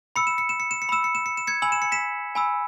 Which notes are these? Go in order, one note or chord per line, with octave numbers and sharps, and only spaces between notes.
B5 E6 C#7
E7
C#7
E7
C#7
E7
C#7
B5 E6 E7
C#7
E7
C#7
E7
G#6 C#7
G#5 B5 E6 F#7
E7
C#7
B6 E7
G#5 B5 E6